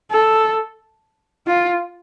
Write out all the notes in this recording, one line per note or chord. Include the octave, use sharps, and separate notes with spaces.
A4
F4